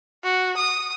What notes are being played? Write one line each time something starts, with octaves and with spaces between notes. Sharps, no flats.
F#4
D#6